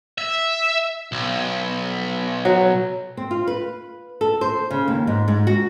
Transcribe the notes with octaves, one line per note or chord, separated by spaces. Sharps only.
E5
B1
F#3
C4
F4
B4
A4
C5
C#3
D#2
G#2
G#2
F#4